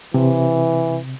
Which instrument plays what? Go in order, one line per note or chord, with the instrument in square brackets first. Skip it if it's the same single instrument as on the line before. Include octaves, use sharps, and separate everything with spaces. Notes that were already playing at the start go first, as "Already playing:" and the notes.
[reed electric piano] C3 [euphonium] E3